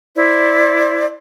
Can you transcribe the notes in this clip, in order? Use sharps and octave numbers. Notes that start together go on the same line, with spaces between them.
E4 C5 D5